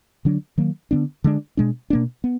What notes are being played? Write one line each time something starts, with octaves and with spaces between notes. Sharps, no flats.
D3 F#3 D4
D#3 F#3 A#3
D3 F#3 B3 D4
D3 G#3 D4
B2 G#3 D4
B2 A#3 D4
B3